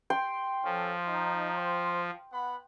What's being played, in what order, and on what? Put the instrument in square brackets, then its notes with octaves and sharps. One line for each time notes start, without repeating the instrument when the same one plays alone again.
[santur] G5 C6
[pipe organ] F3 [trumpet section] C#4 A4
[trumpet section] D#4
C5
B3 F#5 B5